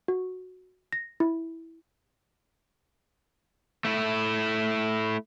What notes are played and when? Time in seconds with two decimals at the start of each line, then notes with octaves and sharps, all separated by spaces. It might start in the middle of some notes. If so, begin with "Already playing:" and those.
0.08 F#4
0.93 A#6
1.20 E4
3.85 A3 E4